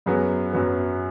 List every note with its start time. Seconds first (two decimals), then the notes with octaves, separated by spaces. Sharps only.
0.06 F#2 F#3 B3 G#4
0.53 F#2 F#3 B3